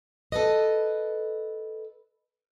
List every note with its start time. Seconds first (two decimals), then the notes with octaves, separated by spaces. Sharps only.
0.32 A4 B4 D#5